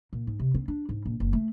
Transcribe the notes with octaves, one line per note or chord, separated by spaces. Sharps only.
A#2
G#2
C3
C4
D4
G#2
A#1
F#1
A3